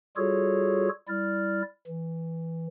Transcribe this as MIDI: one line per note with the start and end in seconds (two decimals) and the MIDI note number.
0.17 0.89 55
0.17 0.89 65
0.17 0.89 66
0.17 0.89 68
0.17 0.89 69
0.17 0.89 73
1.08 1.62 55
1.08 1.62 64
1.08 1.62 74
1.08 1.62 89
1.87 2.67 52